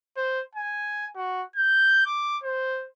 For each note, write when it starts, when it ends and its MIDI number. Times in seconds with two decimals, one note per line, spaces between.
0.17 0.42 72
0.55 1.06 80
1.16 1.44 66
1.56 2.05 91
2.06 2.38 86
2.44 2.87 72